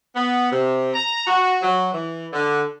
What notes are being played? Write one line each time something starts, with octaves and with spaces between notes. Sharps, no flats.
B3
C3
A#5
F#4
F#3
E3
D3